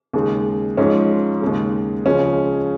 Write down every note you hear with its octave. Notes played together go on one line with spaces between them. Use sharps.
D#2 C#3 G#3
G#2 F3 G#3 C#4
D#2 C#3 G#3
C#2 C#3 F3 G#3 C#4